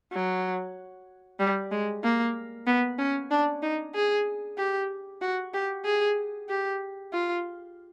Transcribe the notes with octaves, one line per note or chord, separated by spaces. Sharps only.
F#3
G3
G#3
A#3
B3
C#4
D4
D#4
G#4
G4
F#4
G4
G#4
G4
F4